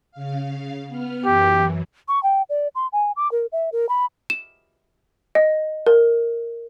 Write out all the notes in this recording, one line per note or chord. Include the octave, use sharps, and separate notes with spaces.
C#3 F5
B3 F6
F#2 E3 G4
C#6
G5
D5
C6
G#5
D6
A#4
E5
A#4
B5
E7
D#5
A#4